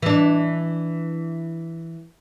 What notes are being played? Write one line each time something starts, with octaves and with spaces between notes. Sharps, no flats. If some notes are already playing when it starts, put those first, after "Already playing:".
E3 D4